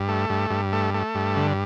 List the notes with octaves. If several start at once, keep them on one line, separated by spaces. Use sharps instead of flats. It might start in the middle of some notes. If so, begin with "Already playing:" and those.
Already playing: G2
A3
G2
G2
A3
A3
G2
D3